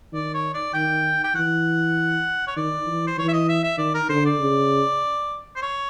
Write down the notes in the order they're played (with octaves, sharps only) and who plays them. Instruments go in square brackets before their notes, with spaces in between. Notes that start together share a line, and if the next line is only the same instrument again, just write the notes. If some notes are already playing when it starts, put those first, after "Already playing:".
[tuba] D#3 [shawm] D5
[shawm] C#5
D5
[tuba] D#3 [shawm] G5
[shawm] G5
[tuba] E3 [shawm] F#5
[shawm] C#5
[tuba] D#3 [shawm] D5
[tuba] E3
[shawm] C5
[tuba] E3 [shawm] C#5
[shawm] E5
D#5
E5
E5
[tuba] D#3 [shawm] D5
[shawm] A#4
[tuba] D3 [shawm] C5
[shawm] D5
[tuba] C#3
[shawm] C5
C#5